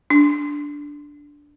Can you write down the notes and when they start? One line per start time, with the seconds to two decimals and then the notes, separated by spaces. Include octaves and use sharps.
0.10 D4